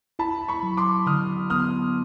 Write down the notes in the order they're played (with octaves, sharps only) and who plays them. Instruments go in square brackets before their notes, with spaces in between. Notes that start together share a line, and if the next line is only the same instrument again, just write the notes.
[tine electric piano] E4 [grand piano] A5 B5
[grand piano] B5 C#6
[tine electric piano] F#3
[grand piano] C6 D6
[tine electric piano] D3 [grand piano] D#6 F6
[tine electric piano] B3 [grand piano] D#6 F6